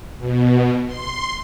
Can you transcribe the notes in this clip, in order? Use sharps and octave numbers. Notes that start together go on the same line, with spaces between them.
B2
C6